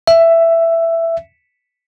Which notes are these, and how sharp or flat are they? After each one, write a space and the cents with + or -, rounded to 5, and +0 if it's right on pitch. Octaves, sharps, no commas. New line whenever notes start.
E5 +10